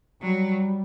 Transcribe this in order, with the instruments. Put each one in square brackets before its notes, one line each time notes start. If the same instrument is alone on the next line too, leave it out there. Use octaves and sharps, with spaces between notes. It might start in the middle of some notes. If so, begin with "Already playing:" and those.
[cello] F#3 [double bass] G3